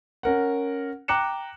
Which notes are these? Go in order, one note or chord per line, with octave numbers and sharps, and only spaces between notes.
C#4 A#4 F#5
G5 A#5 D6 F#6 C#7 E7